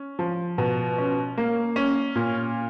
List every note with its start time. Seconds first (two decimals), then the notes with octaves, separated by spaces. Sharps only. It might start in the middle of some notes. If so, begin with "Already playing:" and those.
Already playing: C#4
0.19 F3
0.58 B2
0.98 C#4
1.37 A#3
1.76 C#4
2.15 A#2